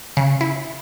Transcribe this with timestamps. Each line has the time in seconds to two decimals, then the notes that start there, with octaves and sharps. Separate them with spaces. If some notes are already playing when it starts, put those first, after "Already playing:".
0.17 C#3
0.41 E4